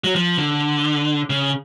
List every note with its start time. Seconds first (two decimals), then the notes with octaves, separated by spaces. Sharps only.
0.04 F#3
0.15 F3
0.38 D3
1.30 C#3